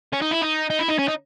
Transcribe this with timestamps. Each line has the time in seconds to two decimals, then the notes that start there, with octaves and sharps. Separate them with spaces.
0.13 C#4
0.21 D#4
0.31 E4
0.42 D#4
0.70 D#4
0.79 E4
0.88 D#4
0.98 C#4
1.08 D#4